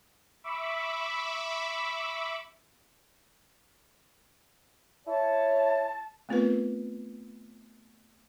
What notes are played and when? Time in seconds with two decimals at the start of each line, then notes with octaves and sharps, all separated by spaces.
0.44 E5 B5 C#6 D6 E6
5.07 E4 C#5 A5
6.29 A3 B3 C4 F4 A#4 B4